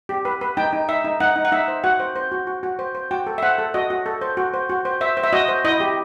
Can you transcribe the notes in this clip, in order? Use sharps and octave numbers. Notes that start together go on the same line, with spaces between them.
G4
B4
B4
D#4 G5
D#4
D#4 E5
D#4
D#4 F#5
D#4
F#5
D#4 E5
C5
F#4 F#5
C5
C5
F#4
F#4
F#4
C5
C5
F#4 G5
A4
E5
C5 F#5
A4
F#4 D#5
F#4
A4
C5
F#4
C5
F#4
C5
C5 E5
C5
E5
F#4 D#5
C5
E4 D#5
G4